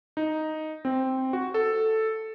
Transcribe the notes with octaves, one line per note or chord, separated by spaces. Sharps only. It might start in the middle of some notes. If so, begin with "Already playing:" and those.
D#4
C4
F#4
A4